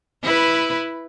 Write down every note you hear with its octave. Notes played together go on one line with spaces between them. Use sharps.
E4 B4